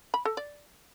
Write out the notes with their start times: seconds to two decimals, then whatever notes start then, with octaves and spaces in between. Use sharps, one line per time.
0.14 B5
0.25 A4
0.37 D5